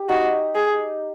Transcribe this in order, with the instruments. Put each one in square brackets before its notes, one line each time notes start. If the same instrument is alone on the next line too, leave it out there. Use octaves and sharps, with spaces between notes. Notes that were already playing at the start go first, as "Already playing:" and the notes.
Already playing: [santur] G4
[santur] D#4 [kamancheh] F#4
[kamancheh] G#4